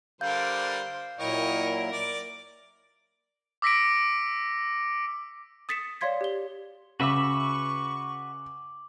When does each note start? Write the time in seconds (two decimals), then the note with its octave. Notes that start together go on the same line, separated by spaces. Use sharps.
0.21 D3 G3 A#4 C5 F5 G6
1.19 A#2 F#3 E4 A#4 C#5 D#5 G5
1.93 D5
3.62 D6 E6 A#6 B6 C#7 D7
5.69 D#6 A6 B6 C#7 E7
6.01 C#5 D5 F5 C6 G#6 B6
6.21 G4 G7
7.00 C#3 F#4 B4 E5 C#6 D6 F#7